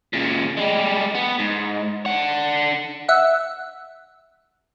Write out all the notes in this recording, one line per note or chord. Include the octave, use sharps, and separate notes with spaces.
A#2 C#3
G3 G#3
B3
G#2
D4 F#5
E5 F#5